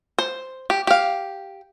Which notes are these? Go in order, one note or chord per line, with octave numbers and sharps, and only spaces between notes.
C5
G4
G4 F5